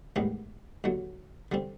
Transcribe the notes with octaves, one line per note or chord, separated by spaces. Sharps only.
A1 G#2 D#3 G3 B3
D#2 D3 F#3
D3 G3 C4